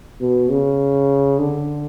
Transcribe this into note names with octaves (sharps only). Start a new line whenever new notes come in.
B2
C#3
D3